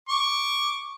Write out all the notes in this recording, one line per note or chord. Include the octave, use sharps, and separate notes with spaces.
C#6 D6